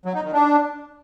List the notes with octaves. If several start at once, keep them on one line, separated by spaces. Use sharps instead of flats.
F#3
D#4
D#3
D4